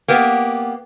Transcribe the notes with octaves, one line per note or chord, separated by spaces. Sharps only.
A#3 B3 G4